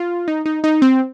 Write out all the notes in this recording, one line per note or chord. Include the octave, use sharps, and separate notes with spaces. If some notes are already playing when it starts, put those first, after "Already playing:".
Already playing: F4
D#4
D#4
D#4
C4